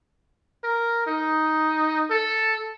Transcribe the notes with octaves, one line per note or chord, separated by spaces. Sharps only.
A#4
D#4
A4